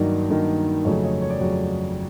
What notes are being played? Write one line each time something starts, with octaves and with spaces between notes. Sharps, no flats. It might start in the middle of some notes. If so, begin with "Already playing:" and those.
Already playing: G2 D#3 F#3 A#3 D#4 D5
G2 D#3 F#3 A#3 D#4
F2 C#3 F#3 A3 C#5 D#5
C#5 D#5
C#5
D5
F2 C#3 F#3 A3 C#5